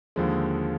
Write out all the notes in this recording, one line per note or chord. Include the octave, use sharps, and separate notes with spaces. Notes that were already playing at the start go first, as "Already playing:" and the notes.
D#2 D3 F3 G#3